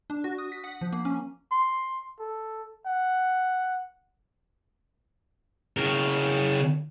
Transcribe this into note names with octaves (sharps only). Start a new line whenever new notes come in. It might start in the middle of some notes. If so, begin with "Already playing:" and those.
D4
F#4
D#6
B6
F#5
F3
A#3
C#4
C6
A4
F#5
C#3 A#4